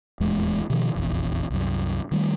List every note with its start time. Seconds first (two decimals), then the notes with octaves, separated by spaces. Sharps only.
0.20 D#1 E2 A2 G#3
0.70 B2 D#3 F3
0.95 F1 A#1 E2
1.50 C2 F#2
2.11 D#3 G3 A3